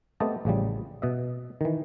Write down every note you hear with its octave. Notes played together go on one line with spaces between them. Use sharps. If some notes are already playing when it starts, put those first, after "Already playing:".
A3 B3 C4 G4 D#5 A5
A1 C#3 F3 G3
B2 D#5 E5
D#3 E3